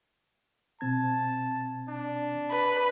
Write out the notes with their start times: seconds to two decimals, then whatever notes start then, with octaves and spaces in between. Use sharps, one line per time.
0.81 B2 C4 A5 G#6
1.88 D4
2.51 B4